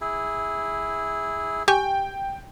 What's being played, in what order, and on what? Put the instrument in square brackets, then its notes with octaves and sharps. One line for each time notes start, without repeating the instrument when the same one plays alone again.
[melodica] E4 G#4
[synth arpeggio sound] G4 G#5 C#6 [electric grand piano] G5